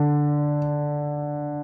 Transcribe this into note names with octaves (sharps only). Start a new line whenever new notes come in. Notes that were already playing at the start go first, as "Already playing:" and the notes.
Already playing: D3